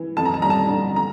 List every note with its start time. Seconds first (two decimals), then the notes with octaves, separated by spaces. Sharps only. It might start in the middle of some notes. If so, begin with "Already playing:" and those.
Already playing: E3
0.17 F2 A5
0.25 A#5
0.34 A5
0.42 G3 A#5
0.50 A5
0.69 D3
0.96 A#5